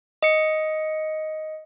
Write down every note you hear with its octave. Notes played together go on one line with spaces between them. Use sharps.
D#5 C#7